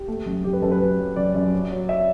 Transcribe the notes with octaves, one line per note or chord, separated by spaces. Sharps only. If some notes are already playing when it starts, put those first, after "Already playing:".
Already playing: G4
A3
F#2
F#2 G4
B4
F#2 A4
B4
F#3
F#3
F#2 D5
F#2
F#3
F#3
E5